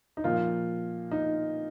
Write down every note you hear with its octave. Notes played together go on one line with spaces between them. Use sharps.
D#4
A#2 F3 A#3 F4
D#4